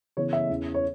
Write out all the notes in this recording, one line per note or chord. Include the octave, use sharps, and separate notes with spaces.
C#3 E3 B3 C#5
E5
E2 E3 C#4
C#5